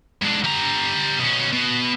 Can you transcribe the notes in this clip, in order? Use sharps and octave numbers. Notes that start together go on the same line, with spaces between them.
G#2 D4
G3 A#5
B2 C#4
B2